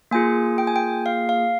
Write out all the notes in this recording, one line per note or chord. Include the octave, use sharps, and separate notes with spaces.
A#3 F4 G#4 G#5
G5
G#5
G5
F5
F5